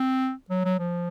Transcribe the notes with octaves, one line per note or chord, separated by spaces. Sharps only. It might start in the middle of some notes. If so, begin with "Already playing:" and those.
Already playing: C4
F#3
F#3
F3